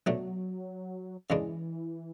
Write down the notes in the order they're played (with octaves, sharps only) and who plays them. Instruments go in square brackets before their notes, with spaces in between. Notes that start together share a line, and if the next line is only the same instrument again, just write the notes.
[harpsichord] B2 A3 D4 [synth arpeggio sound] F#3
[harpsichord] C#3 G#3 D4 [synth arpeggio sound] E3